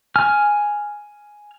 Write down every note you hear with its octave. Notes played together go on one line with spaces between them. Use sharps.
G#5 F6